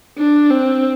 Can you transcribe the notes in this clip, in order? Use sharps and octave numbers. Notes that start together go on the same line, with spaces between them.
D4
C4